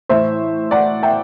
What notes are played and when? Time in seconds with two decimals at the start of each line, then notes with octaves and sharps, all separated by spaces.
0.09 A2 E3 C5 E5
0.71 D5 F#5
1.03 E5 G5